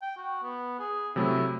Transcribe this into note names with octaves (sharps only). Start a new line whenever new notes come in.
G5
F#4
B3
G#4
C3 F#3 A3 E4